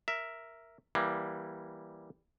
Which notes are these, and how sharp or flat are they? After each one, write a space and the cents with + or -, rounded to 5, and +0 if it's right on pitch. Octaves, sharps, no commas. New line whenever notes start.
A#4 +0 E5 +0
E3 +0 G3 +0 A#3 +15